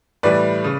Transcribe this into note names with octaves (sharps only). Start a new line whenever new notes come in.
A2 E3 G3 B4 D5
C#3